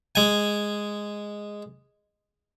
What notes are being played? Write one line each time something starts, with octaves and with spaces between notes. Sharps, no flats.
G#3 G#5